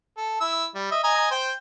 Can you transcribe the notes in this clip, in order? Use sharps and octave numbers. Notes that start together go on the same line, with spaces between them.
A4
E4 E6
G3
D#5 E5
D#5 G#5 A#5
C5 G5